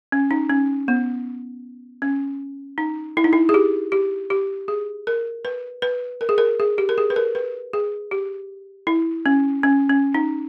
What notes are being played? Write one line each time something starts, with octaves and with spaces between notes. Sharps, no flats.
C#4
D#4
C#4
B3
C#4
D#4
E4
D#4
E4
G#4
G4
G4
G4
G#4
A#4
B4
B4
A#4
G#4
A#4
G#4
G4
A#4
G#4
B4
A#4
B4
G#4
G4
E4
C#4
C#4
C#4
D#4